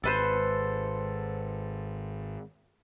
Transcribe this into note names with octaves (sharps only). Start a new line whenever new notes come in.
G#1 A4 B4 C5